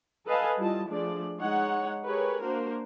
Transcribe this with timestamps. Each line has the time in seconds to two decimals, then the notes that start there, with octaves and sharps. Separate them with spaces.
0.26 A4 B4 D#5 F5 G#5 A5
0.58 G3 E4 F4 D#5 A5
0.89 F3 A3 D4 G#4 D5
1.40 G#3 D#4 C#5 F#5
2.05 G4 G#4 A#4 B4 C#5
2.42 A#3 D4 F#4 A#4 C5